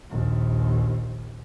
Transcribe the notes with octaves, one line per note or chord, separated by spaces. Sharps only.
A#1 D#2